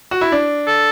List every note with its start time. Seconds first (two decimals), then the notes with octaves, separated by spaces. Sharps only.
0.11 F#4
0.21 E4
0.32 D4
0.67 A4